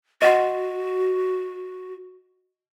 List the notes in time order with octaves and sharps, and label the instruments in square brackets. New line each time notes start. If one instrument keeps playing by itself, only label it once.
[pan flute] F#4 [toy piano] D#5 F#5 C6